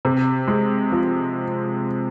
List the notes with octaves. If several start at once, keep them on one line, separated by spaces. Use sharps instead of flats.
C3
G#3
F3